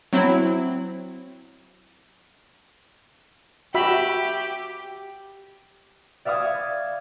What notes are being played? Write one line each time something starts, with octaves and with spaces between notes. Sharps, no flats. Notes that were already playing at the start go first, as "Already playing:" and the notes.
F#3 C4 E4
F#4 G4 E5 B5
D5 E5 F5 C#6 D#6 G#6